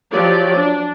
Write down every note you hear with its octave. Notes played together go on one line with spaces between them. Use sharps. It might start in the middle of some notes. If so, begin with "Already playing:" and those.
F3 F#3 G4 C#5 D5
D4